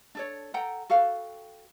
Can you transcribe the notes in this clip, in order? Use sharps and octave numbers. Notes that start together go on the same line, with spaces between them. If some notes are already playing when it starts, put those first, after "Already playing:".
D4 A4 C#5
A4 F#5 G5 A#5
F#4 A4 F5 G5